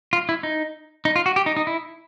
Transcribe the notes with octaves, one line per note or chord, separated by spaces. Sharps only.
F4
E4
D#4
D#4
F4
F#4
G4
D#4
D#4
E4